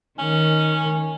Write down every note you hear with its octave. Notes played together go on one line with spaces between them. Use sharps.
D#3 C#4